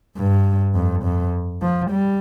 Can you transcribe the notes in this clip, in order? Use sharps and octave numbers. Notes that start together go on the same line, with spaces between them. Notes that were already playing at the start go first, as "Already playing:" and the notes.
G2
F2
F2
F3
G3